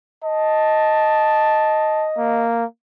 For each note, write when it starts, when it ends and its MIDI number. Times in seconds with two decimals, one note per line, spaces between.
0.24 2.47 75
0.24 2.06 81
2.18 2.65 58